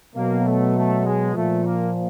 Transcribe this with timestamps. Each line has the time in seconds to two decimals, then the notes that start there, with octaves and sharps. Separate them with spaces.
0.16 B2 F#3 A#3
0.45 A3
0.76 A3
1.06 G#3
1.35 A#2 F3 A3
1.65 A#3